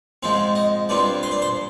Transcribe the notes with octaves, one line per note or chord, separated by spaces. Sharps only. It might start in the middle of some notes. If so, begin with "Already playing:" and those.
G#2 F3 C4
D#5
G2 F3 C4 D5
C5
D5
C5